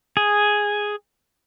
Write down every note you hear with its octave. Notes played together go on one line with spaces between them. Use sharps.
G#4